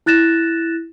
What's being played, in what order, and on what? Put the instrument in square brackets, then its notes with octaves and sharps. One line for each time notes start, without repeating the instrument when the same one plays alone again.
[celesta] E4 F#6 A6 A#6 E7